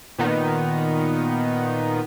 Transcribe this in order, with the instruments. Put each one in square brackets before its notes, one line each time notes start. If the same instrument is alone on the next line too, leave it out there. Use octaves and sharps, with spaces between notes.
[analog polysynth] A#2 D#3 B3 D#4